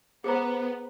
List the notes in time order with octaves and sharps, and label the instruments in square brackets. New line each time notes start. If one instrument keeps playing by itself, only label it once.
[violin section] B3 [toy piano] G#4 C5 A#5